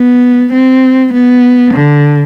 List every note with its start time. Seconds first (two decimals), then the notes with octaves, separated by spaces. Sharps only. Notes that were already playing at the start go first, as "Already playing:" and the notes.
Already playing: B3
0.53 C4
1.14 B3
1.74 D3